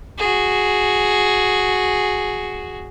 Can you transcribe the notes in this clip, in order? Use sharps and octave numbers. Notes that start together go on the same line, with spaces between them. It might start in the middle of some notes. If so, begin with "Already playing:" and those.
F#4 G#4